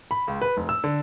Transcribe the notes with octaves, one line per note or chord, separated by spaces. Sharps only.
B5
C#2
B4
F1
E6
D3